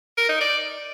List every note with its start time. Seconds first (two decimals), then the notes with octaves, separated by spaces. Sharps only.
0.18 A#4
0.29 D#4
0.41 D5